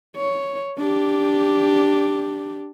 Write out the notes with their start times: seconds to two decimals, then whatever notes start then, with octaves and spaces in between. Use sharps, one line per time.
0.17 C#5
0.78 D4 G4